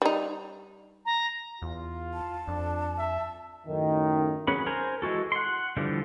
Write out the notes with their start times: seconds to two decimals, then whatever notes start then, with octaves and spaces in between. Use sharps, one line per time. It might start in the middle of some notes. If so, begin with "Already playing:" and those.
0.02 G3 D#4
1.06 A#5
1.62 E2 F4
2.14 A5
2.48 F2 D4
2.98 E5
3.67 F#2 A2 D#3
4.47 F#3 C#4 G#4 B4 B5
4.66 A#4 C5 G#5 A#5
5.02 E3 G#3 F#4 A4
5.32 F#5 C6
5.77 D3 E3 F3 G3